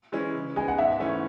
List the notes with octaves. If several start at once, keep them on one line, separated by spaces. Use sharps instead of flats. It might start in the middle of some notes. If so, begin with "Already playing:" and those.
E3 G#3 C#4 E4
C#3
G#3 B3 D#4 G#5
F#5
G#2 E5
E3 A3 C#4